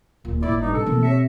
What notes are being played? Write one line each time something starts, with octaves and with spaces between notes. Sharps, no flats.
D1 A#2
G1 A2 E4 D5 D6
G2 D#4
C3 A4 E6 C#7
F1 B2 E3 F3 A#3
C3 C#5 E5 A#6 C#7